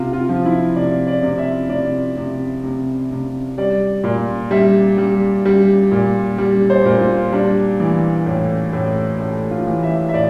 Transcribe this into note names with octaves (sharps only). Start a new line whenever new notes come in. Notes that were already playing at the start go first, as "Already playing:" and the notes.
Already playing: C3 F4
F4
F3
E4
C3 D5
D5
C3
E5
C3 D5
C3
C3
C3
G3 D5
A#2
G3 E5
G3
G3
A#2
G3
C5
A#2
F4
G3 D4
E3
A2
A2
A2
F4
E3
E5
E5
A2 D5